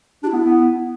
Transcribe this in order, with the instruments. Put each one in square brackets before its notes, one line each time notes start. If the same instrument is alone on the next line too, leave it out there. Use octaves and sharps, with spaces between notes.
[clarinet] D4 [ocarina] G4
[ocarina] E4
[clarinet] B3
B3